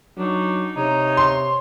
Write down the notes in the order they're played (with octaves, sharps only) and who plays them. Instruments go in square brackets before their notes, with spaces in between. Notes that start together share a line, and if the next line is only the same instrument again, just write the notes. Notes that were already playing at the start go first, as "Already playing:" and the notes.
[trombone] F#3 [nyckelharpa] D4 D#4
[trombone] C3 [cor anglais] D#4 [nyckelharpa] C#5
[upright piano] C6